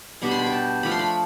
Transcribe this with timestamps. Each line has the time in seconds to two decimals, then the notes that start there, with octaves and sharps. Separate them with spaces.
0.22 B2 G3 B3 D4 B5
0.31 C6
0.39 B5
0.46 G5
0.52 A5
0.83 F3 A3 D4 B5
0.91 C6
0.99 B5